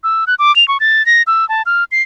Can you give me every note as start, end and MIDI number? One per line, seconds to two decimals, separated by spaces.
0.04 0.25 88
0.27 0.35 90
0.39 0.54 86
0.56 0.67 101
0.68 0.78 85
0.80 1.05 93
1.06 1.22 94
1.27 1.47 88
1.49 1.62 81
1.66 1.84 89
1.92 2.02 96